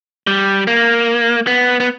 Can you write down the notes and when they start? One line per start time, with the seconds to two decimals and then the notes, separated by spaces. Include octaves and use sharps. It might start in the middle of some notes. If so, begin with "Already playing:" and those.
0.27 G3
0.67 A#3
1.47 B3
1.80 B3